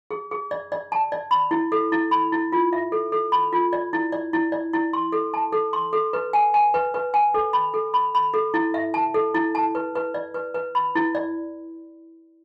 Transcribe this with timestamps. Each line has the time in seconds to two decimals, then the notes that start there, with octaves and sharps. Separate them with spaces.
0.11 G#4
0.31 G#4
0.51 D5
0.72 D5
0.92 A5
1.12 D5
1.31 B5
1.51 E4
1.72 A4
1.92 E4
2.11 B5
2.32 E4
2.52 F4
2.73 E5
2.92 A4
3.12 A4
3.32 B5
3.53 F4
3.73 D5
3.93 E4
4.12 D5
4.33 E4
4.52 D5
4.73 E4
4.93 C6
5.12 A4
5.34 A5
5.53 A4
5.73 C6
5.93 A4
6.13 B4
6.33 G#5
6.54 G#5
6.74 B4
6.94 B4
7.14 G#5
7.34 A4
7.53 B5
7.74 A4
7.94 B5
8.15 B5
8.34 A4
8.54 E4
8.74 E5
8.94 A5
9.14 A4
9.35 E4
9.55 A5
9.75 B4
9.95 B4
10.14 D5
10.34 B4
10.54 B4
10.75 B5
10.95 E4
11.15 D5